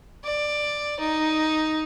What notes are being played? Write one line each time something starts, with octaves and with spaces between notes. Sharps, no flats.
D5
D#4